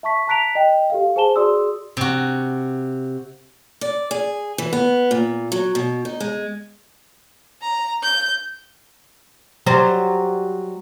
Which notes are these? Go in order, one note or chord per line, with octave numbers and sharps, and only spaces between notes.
E5 A5 C#6 B6
A5 A#5 F#6 B6 D7 F7
D#5 G5
G4 A4 F5
G#4 C5 G#5 A5 E7 G7
F#4 G#4 D5 C6 D#6 E6
C3 F#4
D5
G#4
E3
B3
A#2
F#3
B2
D#4
G#3
A#5
G6
F#3 G3 C5